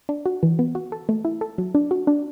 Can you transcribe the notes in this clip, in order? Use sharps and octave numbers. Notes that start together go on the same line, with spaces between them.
D4
F#4
E3
B3
F#4
A4
A3
E4
A4
F#3
D4
F#4
D4